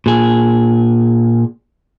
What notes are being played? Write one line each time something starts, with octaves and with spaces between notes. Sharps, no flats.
A#2 G#4